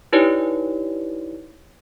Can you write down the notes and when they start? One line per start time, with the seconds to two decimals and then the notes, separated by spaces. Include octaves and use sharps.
0.13 D#4 E4 G4 B4 C#5 D5